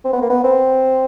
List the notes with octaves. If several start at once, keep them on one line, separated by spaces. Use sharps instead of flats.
C4
B3
A#3
B3
C4